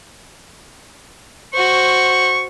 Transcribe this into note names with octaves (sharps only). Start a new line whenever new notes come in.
F#4 C5 C#6